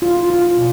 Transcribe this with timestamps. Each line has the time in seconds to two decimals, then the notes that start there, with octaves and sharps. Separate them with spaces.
0.02 F4
0.30 F4
0.57 B2